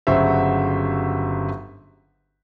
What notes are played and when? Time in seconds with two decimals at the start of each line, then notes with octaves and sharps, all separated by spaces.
0.07 G1 C#3 F#3 F#4 C5 E5